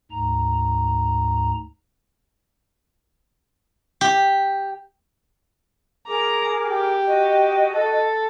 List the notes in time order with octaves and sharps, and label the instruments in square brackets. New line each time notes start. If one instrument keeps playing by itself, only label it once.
[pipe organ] D2 G#2 A#5
[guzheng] G4
[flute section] G#4 A#4 D6 [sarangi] A#5
[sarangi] G4
[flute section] F#4 D#5
[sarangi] A4